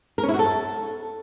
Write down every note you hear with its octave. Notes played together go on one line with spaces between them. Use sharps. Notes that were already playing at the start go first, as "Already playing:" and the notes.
A#4
C#4
E4
F#4
A4